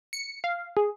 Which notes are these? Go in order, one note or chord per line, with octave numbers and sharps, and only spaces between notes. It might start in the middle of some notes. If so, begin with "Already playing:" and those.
C#7
F5
G#4